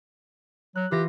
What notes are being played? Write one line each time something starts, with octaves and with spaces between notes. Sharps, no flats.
F#3 F#6
E3 F4 G4 A#6